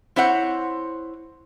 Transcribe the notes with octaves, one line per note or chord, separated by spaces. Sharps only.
C4 E4 C5 C#5 F#5